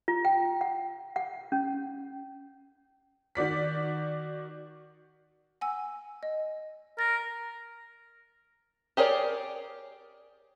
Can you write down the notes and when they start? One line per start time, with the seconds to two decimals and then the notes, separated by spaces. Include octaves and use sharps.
0.08 F4
0.25 G5
0.61 F#5
1.16 F#5
1.52 C#4
3.35 D#3 F#4 D5 B6
5.61 F#5 G#5 E6
6.23 D#5
6.99 A#4 A6
8.97 G4 G#4 A#4 C#5 D5